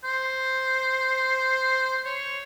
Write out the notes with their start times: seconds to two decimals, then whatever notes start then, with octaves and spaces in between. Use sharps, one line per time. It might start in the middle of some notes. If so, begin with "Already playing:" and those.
0.04 C5
2.05 C#5